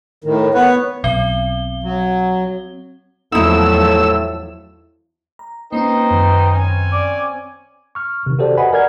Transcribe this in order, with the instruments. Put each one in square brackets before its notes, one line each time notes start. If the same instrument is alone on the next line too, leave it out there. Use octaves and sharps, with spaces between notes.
[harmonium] A2 D#3
B3 B4 C#5
[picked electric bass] B1 [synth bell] C4 G7
[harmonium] F#3
[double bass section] E2 F3 F#3 [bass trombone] A2 [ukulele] D#4 E4 [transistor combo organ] E6
[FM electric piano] A#5
[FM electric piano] A#3 C4 C#4 [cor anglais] D#4 [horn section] B4 C5 G5
[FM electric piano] F#2 D#3
[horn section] C4 C#4 G#5
[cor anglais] D5
[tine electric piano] C#6 F6
C3 D#3
F#4 G4 A4 C5 D5
B4 D#5 F#5 G#5 B5
A#4 D5 F#5 F6 G#6